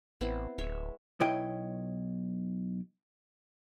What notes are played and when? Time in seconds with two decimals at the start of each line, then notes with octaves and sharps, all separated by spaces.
0.21 A1 B3 C4 E4
0.58 D1 G#3 C#5 E5
1.20 B1 B2 E4 C#5 D#5 G5